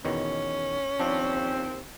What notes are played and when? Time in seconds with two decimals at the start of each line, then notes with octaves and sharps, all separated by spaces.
0.05 E2 B2 D#3 C#4
1.00 D#2 F3 C4 D4